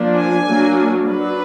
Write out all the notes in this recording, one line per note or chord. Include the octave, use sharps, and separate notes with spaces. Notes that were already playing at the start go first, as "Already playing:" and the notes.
Already playing: F3 A#3 D4
G#5
F#3 A#3 D4
F#3 D4 B4